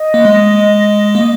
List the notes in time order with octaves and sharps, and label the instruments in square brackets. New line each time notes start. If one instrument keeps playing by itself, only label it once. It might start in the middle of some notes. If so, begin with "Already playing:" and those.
Already playing: [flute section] D#5
[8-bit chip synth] A#3
G#3
[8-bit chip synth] A#3 [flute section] D#5